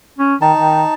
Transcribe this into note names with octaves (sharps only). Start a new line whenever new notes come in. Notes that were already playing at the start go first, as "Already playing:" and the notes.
C#4
D#3 D#4 A5
D#3